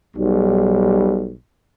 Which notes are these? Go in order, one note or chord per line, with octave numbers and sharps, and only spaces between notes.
B1 G3